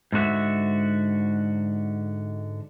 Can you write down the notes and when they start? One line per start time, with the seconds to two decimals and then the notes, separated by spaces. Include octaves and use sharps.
0.12 G#2 D3 F#4 E5